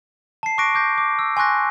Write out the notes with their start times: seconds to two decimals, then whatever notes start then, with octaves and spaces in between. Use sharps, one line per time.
0.43 A5 C7
0.58 C#6 D6 F#6 A#6 D7
0.75 D6 G6 A#6
0.98 D6
1.19 E6
1.37 G#5 C6 C#6 F#6 A#6